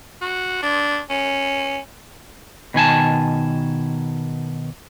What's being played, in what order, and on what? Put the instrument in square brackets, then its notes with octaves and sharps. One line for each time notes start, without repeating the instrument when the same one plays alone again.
[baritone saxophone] F#4
D4
C#4
[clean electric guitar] B2 D#3 G#5 A5